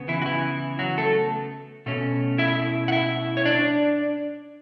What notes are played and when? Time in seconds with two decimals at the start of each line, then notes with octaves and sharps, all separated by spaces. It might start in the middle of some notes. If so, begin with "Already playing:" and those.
Already playing: C#3 B3
0.08 E3 E4
0.22 F#4
0.26 E3 E4
0.79 F#3 F#4
0.98 A3 A4
1.86 B2 A3 C#4
2.38 E4 E5
2.88 F#5
2.92 E4 E5
3.37 C#5
3.45 D4 D5